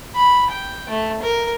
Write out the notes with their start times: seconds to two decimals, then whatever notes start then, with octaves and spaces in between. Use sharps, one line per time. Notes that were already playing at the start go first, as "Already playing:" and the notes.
0.15 B5
0.50 G5
0.89 A3
1.22 A#4